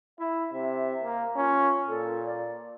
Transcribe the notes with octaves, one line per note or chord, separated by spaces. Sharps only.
E4 E5
C3 E5
A#3
C#4 F4
A#2 A4
D5